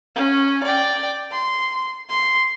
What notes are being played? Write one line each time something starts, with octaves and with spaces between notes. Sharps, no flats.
C#4
D5 G5
C6
C6